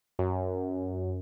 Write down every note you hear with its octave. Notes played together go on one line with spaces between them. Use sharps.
F#2